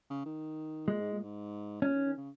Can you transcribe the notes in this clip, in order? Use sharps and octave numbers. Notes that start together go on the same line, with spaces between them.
C#3
D#3
A#2 G#3
G#2
A#2
G#2
A#2 C#4
D#3
D#3
C#3